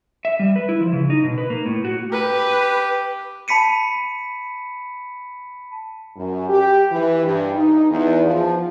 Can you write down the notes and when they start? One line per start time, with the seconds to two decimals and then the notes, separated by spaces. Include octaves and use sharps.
0.25 E5
0.39 G3
0.56 B4
0.69 E4
0.81 F3
0.93 C#3
1.10 D#4
1.24 B2
1.38 B4
1.50 A#3
1.66 A2
1.85 F#4
2.13 G4 B4
3.48 A5 B5 B6 C#7 D#7
6.16 F#2
6.49 G4
6.91 E3
7.24 G2
7.55 D#4
7.90 E2
8.25 F3